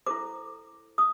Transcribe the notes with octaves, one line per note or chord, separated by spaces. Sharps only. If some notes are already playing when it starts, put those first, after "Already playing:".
E4 A4 C5 D6
D#6